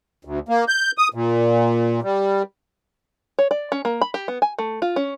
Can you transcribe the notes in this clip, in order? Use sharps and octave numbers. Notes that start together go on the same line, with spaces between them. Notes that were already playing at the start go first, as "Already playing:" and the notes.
D2
A#3
G6
D#6
A#2
G3
C#5
D5
C#4
A#3
B5
G4
B3
G#5
A3
F4
C#4